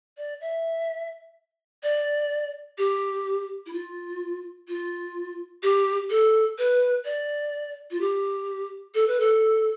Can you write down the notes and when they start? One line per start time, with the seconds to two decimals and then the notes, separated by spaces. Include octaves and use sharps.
0.17 D5
0.41 E5
1.83 D5
2.78 G4
3.66 E4
3.73 F4
4.68 F4
5.63 G4
6.10 A4
6.58 B4
7.05 D5
7.91 F4
8.01 G4
8.95 A4
9.08 B4
9.20 A4